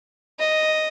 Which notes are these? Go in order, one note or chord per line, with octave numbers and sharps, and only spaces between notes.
D#5